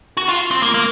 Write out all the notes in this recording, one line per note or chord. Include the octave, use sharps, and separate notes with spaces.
F#4
F4
C4
A#3
A#3